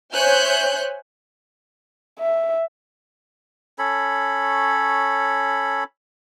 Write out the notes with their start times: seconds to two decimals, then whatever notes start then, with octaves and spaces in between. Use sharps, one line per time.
0.13 C5 C#5 E5 G#5 F#6 G6
2.19 E5
3.79 C#4 A4 C#5 B5